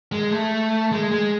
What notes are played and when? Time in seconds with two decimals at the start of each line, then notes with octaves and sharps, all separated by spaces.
0.12 G#3
0.31 A3
0.92 G#3
1.11 G#3